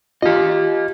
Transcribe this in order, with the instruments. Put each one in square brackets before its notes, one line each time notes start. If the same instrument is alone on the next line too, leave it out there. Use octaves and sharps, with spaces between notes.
[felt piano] F4 [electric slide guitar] G4 D#5